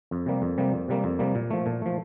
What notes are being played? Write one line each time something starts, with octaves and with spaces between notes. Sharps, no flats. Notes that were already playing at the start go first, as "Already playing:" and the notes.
F2
C3 G3 A#3
F2
C3 G3 A#3
F2
C3 G3 A#3
F2
C3 G3 A#3
A#2
F3 A3
A#2
F3 A3